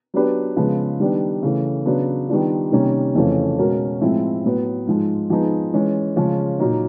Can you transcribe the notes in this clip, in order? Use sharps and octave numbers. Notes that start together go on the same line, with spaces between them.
F#3 B3 D4 G4 B4
C#3 F3 G#3 B3
D#3 G3 B3 D4
C#3 E3 A3
C#3 F#3 B3 D4
D#3 G3 B3 D4 F4
C3 D#3 G3 A#3 C#4
F2 C#3 E3 A3 C#4
B2 G#3 C#4 F#4 A#4
A2 F3 G#3 C4 E4
A2 F#3 B3
G#2 F3 G#3
F3 G#3 B3 D#4 G#4
E3 G#3 C#4
C#3 F3 G#3 C#4
A#2 F#3 A#3 D#4